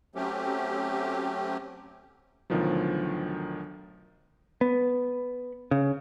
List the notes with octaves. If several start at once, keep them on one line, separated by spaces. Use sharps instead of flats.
F#3 A3 C4 C#4 G4
D2 B2 D#3 F3 F#3
B3
C#3